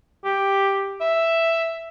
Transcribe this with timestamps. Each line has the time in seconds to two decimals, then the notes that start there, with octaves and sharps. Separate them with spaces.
0.25 G4
1.01 E5